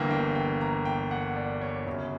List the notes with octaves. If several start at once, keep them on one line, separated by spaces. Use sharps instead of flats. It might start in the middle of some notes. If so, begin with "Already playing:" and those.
Already playing: G1 G2 E3 A#3 G5
G5
G5
A#5
G5
F#5
D5
C#5
G1 F#2 C#3